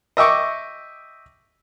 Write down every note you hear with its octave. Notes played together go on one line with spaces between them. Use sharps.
D#5 E5 G5 C#6 D6